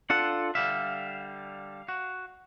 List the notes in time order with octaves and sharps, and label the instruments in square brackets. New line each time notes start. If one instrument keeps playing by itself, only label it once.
[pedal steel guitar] D4 F4 A4 [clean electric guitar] F#5
[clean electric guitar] D3 G3 E5 [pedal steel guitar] F5
[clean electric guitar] F#4